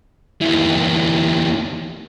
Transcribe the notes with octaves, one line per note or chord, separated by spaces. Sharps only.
D#2 E3